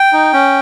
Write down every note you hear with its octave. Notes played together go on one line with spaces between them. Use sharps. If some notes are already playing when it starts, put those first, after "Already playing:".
Already playing: G5
D#4
C#4